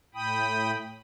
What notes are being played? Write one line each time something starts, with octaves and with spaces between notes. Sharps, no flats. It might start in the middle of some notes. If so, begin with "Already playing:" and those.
A2 G5 B5 D#6